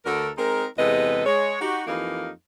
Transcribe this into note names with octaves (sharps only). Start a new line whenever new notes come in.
D2 D3 F#4 A4 A#4
G#3 C4 D#4 A#4
E2 C3 G#3 A4 B4 D#5
G#3 C#5
D#4 F#4 G4
F2 E3 A#3 D#4 G4 F5